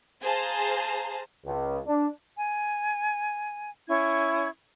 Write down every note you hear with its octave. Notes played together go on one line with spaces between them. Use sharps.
G#4 C5 F5 A5 A#5
C#2
D4
G#5
C#4 E4 C#6 G#6